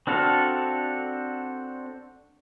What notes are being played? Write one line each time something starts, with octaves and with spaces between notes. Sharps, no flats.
C4 D4 F#4 A4 F5